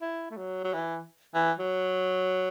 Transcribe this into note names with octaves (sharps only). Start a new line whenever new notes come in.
E4
A3
F#3
F#3
E3
E3
F#3